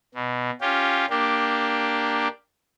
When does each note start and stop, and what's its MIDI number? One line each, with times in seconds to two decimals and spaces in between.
0.15 0.51 47
0.61 1.06 61
0.61 1.06 65
0.61 1.06 67
1.10 2.28 58
1.10 2.28 62
1.10 2.28 67